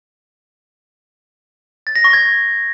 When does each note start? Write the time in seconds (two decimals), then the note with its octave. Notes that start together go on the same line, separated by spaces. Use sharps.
1.87 A6
1.96 A#6
2.04 C#6
2.13 G#6